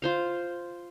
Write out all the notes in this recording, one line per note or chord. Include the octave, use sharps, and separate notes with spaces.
F4 C5 F5